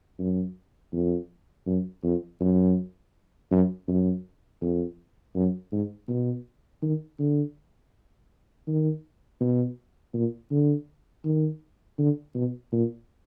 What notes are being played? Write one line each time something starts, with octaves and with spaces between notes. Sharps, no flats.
F#2
F2
F#2
F2
F#2
F#2
F#2
F2
F#2
G#2
B2
D#3
D3
D#3
B2
A#2
D3
D#3
D3
B2
A#2